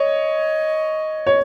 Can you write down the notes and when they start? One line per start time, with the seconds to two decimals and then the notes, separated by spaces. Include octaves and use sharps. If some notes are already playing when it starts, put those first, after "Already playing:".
Already playing: C#5 D#5
1.27 C#5